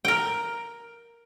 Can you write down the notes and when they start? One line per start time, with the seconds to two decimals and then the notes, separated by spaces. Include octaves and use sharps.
0.05 A#4 G5